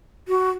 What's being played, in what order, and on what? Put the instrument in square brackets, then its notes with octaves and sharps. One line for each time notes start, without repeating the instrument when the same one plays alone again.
[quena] F#4